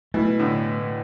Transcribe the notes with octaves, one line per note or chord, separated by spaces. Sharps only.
B2 E3 A3
A2 D3